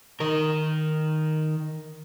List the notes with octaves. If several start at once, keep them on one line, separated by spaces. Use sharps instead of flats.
D#3 A#4